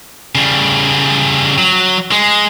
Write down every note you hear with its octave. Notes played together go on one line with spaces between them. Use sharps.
C#3 G3
F#3
G#3